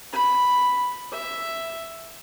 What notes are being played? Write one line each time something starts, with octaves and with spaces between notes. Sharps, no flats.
B5
E5